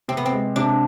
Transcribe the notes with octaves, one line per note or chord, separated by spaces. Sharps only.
C3 C4
B3
C4
G#3
C3 D4